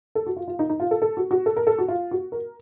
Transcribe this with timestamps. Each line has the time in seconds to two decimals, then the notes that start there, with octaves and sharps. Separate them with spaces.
0.15 A4
0.27 F#4
0.37 F4
0.48 F4
0.59 D#4
0.69 D#4
0.80 F4
0.91 A4
1.02 A4
1.17 F#4
1.31 F#4
1.46 A4
1.56 A#4
1.67 A4
1.78 F#4
1.88 F4
2.11 F#4
2.32 A#4